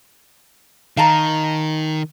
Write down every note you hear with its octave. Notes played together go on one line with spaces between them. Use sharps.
D#3 F5 A5 A#5